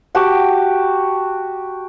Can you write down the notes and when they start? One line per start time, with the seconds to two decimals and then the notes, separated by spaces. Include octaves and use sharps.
0.15 F#4 G4 A5 D6